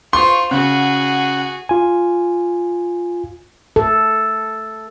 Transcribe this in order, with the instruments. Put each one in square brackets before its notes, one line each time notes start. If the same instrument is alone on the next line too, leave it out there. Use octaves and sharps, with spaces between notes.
[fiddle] F4 C5 [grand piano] C6 [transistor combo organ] C#6
[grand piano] C#3 [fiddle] F#4 G#4 [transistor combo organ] F#5
[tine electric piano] F4 G#5
[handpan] A4